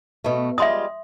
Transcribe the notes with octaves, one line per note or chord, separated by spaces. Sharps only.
B2 A3
G3 G#3 F4 E5 C6 D#6